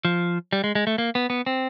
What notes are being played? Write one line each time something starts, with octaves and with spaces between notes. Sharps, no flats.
F3
G3
G#3
G#3
A3
A#3
B3
B3
C4